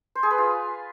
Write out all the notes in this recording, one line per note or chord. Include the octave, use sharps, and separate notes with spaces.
C5
G#4
B4
F4